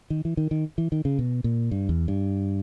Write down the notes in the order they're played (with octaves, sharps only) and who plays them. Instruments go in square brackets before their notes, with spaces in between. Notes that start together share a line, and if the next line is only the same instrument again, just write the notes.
[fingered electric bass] D#3
E3
D#3
D#3
E3
D#3
C#3
B2
A#2
G2
E2
G2